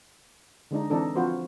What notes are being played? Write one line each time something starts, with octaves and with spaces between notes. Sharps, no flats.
D3 G#3 D4 D#4
E3 C4 D4 D#4 A4
F3 C4 F4 F#4 B4 C5